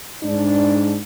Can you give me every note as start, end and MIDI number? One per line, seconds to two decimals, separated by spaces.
0.23 0.97 44
0.23 0.97 62